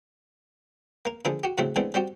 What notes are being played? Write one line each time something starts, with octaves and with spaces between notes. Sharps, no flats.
A#3 A#4
D3 F3 A#3 D4 G#4
F#4 G4
A2 C#3 F#3 A3 C4 E4
E3 G#3 A3 B3 C4 D4
G3 C4 F#4 G4